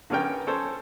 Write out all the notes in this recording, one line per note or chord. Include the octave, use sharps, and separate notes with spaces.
D3 B3 C#4 A#4 G5
C#4 A4 C5